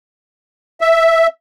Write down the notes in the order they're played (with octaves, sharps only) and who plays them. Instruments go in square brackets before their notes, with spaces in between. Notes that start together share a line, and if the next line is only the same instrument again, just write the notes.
[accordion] E5